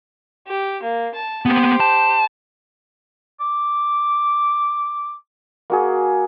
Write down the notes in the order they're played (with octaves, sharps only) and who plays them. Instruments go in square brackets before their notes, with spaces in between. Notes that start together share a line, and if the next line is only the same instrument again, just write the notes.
[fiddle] G4
A#3
A5
[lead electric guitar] A#3 B3 [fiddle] G4 C5
[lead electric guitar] A5
[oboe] D6
[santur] A#3 F#4 G#4